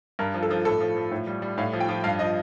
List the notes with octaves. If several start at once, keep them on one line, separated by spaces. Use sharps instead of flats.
G2 A#4
F3
A4
F3
A2 A4
F3
F3
A2
G3
G3
A2 F5
F3
G5
F3
G2 F5
F3 D#5